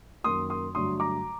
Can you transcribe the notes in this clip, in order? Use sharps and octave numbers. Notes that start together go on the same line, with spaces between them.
F#2 D#3 F#3 A#3 C6 D#6
C6 D#6
G2 D3 F#3 A3 C6 D#6
A#5 D6